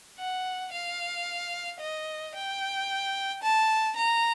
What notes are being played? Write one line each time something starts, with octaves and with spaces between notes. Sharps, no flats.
F#5
F5
D#5
G5
A5
A#5